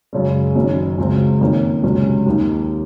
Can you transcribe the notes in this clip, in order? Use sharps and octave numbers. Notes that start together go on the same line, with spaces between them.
F#2 C#3 G#3 C#4
F#1 F#2 D#3 F#3 C#4
C#2 C#3 F#3 C4
F2 D#3 A#3 C#4
C#2 C3 F#3 C#4
D#2 D#3 A#3 D#4